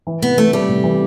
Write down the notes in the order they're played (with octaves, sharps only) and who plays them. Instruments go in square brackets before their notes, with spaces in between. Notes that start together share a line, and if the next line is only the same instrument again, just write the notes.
[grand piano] E3
[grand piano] C3 [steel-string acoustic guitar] B3
[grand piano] E3 [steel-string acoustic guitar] A3
[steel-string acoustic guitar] G3 [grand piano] A3
[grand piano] C3
E3